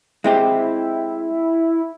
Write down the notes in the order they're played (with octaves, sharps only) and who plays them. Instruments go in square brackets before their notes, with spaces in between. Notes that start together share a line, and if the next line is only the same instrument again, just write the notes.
[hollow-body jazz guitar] G#3 C4 G4 [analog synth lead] E4